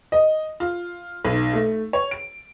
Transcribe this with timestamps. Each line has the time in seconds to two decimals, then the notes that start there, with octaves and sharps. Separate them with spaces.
0.12 D#5
0.60 F4
1.25 B1
1.53 A3
1.93 C#5
2.11 D7